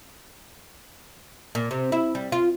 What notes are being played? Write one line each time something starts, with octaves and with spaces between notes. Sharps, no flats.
A#2
C3
E4
G3
F4